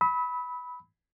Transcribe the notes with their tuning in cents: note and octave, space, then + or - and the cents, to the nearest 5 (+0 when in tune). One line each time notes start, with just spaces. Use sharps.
B5 +0 E6 -45